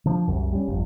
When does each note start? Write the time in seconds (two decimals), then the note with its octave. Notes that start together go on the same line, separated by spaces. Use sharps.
0.06 D3 F3
0.28 C2 F#2
0.52 G3 C#4
0.68 G1 F2